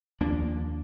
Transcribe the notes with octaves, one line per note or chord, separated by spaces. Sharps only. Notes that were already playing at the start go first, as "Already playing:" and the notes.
D#2 F3 A#3 D4